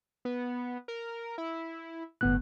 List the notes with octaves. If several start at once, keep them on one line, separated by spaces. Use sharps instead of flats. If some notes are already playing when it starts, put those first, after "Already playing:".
B3
A#4
E4
G1 A2 B3 F#6